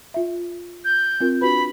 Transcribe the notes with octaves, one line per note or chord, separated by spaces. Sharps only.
F4 E5
G6
C4 F4 A#4
D4 F#4 B4 B5